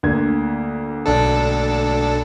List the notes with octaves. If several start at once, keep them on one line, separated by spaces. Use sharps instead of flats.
D2 A#3 G#6
B1 D4 A4